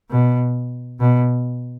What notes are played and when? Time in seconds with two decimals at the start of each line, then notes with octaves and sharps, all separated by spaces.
0.10 B2
1.00 B2